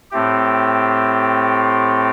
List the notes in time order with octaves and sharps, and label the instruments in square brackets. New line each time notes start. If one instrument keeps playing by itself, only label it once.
[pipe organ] A2 A3 C4 G4